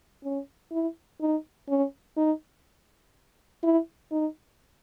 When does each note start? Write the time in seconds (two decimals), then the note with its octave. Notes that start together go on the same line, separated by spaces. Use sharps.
0.24 C#4
0.72 E4
1.21 D#4
1.69 C#4
2.17 D#4
3.63 E4
4.12 D#4